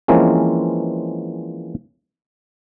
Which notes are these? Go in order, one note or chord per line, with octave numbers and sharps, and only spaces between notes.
E3 F3 G#3 A#3 C4 C#4